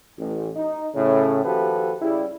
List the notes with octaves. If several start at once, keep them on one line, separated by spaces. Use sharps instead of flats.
A1
D#4
A2 C#3
D#2 F3 F#4 G4 A4 B4
C#3 G3 E4